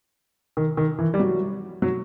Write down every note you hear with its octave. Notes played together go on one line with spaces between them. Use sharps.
D#3
D#3
E3
G3
F#3
F#3